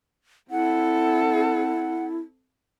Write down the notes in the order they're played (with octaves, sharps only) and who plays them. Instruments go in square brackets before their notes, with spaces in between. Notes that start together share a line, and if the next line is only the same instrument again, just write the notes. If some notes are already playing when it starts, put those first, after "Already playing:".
[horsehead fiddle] C4 A4 [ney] E4 [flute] F#5